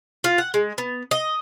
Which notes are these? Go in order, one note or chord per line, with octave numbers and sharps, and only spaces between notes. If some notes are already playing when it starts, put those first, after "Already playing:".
F4
F#5
G#3
B3
D#5